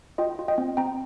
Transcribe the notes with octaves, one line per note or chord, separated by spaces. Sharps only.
F4 D#5 G5
F4
D#5 G5
C4
C4 G5 A#5